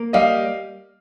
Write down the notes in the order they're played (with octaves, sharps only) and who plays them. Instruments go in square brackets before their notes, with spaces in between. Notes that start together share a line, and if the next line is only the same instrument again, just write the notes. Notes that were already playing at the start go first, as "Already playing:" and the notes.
Already playing: [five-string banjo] A#3
[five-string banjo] G3 [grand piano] D#5 F5